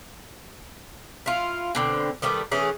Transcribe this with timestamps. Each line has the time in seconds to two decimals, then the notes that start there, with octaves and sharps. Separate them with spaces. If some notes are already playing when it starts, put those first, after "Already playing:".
1.26 E4 F4
1.75 B2 D3 C4
2.22 D#3 G3 A3 B3
2.52 E3 A3 C#4 G#4